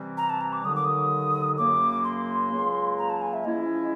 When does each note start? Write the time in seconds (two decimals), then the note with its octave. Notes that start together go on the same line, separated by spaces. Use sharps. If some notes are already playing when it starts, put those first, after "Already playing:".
Already playing: C3 E3 G3 C4
0.17 A#5
0.30 A5
0.41 A#5
0.53 D6
0.64 D#2 D3 F#3 D#6
0.75 D6
0.85 D#6
1.57 F#2 C#3 F#3 A#3 D6
2.04 C6
2.51 C#2 C#3 F#3 A#3
2.98 A#5
3.10 A5
3.22 G#5
3.33 E5
3.45 F3 G#3 C#4 E4 D#5